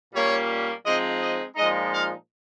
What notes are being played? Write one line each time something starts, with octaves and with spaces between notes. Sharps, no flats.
A#2 G3 A#3 C#4 C#5
F3 G#3 C4 D#4 D#5
D#5
A#2 F3 G#3 D#4 D#5
F5